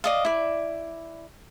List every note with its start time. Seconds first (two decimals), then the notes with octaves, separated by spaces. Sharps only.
0.04 D5 D#5 F5
0.25 E4 D5